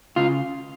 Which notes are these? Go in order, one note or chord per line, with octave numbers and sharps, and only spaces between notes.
C#3 F4